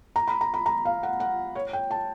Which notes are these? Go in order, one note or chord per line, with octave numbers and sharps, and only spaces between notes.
A#5
B5
A#5
B5
A#5
F5
F#5
F#5
C#5
G5
A5